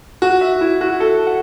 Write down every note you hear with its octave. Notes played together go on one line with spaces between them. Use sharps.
F#4
E5
E4
F#4
A4
F#5